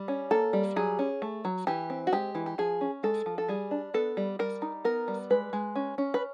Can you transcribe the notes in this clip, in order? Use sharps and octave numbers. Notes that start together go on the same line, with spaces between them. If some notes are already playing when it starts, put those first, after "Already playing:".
Already playing: G3
C#4
A#3 A4
G3
F#3 G#4
C#4
A3
F#3
E3 G4
C4
F#4
G#3 G4
E3
G4
F3 G#4
C#4
G#3 A4
F3
A4
G3 G#4
D4
B3 A4
G3
G3 A#4
D#4
B3 A#4
G3
G#3 B4
G#3
C#4
C#4
B4